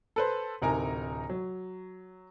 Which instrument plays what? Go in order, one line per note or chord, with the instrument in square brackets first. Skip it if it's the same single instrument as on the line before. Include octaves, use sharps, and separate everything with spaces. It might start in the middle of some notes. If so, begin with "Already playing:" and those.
[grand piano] A4 B4 C5
D1 C3 D#4 A#4 G#5 A#5
F#3